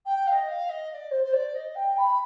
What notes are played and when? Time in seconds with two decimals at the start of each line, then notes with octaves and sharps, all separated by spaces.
0.05 G5
0.26 F5
0.31 D#5
0.48 F5
0.69 D#5
0.90 D#5
0.93 D5
1.10 C5
1.23 C5
1.32 D5
1.54 D#5
1.75 G5
1.96 B5